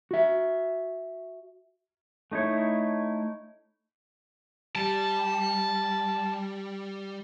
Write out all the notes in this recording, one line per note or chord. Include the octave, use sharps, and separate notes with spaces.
F#4 E5
A3 D#4 E4 C#5
G3 A5